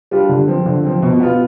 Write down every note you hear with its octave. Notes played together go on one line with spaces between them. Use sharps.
G3 D4 F4
D3
F3 C4
D3
F3 C4
B2
B3 F4